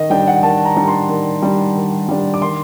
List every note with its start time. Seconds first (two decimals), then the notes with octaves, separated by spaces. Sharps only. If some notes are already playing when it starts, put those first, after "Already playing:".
Already playing: D#3 D#5
0.10 G3 D4 G5
0.27 F#5
0.43 D#3 A5
0.65 A#5
0.77 G3 D4
0.88 C6
1.09 D#3
1.42 G3 D4
1.75 D#3
2.08 G3 D4
2.34 D6
2.42 D#3 C6